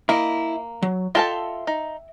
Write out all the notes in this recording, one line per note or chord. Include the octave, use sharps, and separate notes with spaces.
A#3 E4 D#5
F#3
F4 A4 D#5 E5 G5 A5
D#4